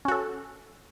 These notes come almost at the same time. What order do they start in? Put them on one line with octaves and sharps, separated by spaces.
C#4 F#4 A4